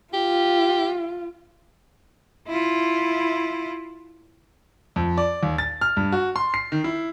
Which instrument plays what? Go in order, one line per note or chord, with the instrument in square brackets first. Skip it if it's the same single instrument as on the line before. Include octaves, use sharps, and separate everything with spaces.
[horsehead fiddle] F4 [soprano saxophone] G4
[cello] E4 F4
[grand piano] F2
D5
D#2
A6
F6
G2
F#4
C6
C7
D#3
E4